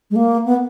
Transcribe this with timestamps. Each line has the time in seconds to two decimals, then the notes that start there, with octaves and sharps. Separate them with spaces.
0.11 G#3
0.16 A#3
0.46 B3